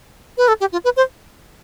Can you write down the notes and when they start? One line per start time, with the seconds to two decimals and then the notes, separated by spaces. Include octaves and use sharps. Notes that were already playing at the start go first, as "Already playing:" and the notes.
0.37 B4
0.48 A4
0.61 G4
0.72 F4
0.84 B4
0.97 C5